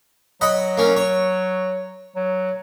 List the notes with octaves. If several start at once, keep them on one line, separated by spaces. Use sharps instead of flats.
F#3 D#5 F#5 B5
A#3 C#4
C#5
F#3